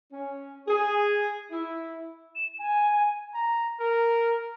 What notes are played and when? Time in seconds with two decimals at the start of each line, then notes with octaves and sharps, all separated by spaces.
0.13 C#4
0.68 G#4
1.51 E4
2.35 E7
2.58 G#5
3.34 A#5
3.80 A#4